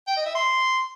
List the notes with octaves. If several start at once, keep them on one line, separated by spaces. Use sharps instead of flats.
G5
D#5
E5
C6